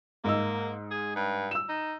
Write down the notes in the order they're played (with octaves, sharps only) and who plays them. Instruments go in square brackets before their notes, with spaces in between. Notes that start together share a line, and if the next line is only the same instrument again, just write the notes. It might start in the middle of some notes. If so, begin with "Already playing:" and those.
[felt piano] G#2 D#5 E6 [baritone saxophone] A#3
[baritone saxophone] G#4
G2
[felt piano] E6 E7
[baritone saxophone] D#4